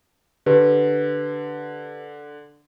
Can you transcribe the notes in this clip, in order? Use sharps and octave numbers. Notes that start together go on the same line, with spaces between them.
D3 G4 B4